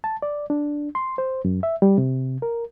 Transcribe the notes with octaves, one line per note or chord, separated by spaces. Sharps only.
A5
D5
D4
C6
C5
F#2
E5
G3
C3
A#4